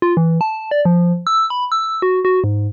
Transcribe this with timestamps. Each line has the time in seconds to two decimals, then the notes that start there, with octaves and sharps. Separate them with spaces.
0.02 F4
0.17 E3
0.41 A5
0.71 D5
0.85 F3
1.27 E6
1.50 B5
1.72 E6
2.02 F#4
2.25 F#4
2.44 G#2